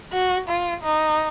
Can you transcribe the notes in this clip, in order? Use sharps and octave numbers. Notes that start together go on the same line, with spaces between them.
F#4
F4
D#4